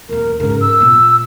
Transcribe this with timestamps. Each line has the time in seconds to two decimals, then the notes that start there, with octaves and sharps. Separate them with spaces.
0.09 D#1 A#3 A#4
0.40 G#2 C#3 A#4
0.61 E6
0.80 A#2 B3